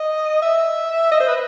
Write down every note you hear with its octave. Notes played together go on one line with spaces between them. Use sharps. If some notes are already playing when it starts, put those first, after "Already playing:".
Already playing: D#5
E5
D#5
C5
B4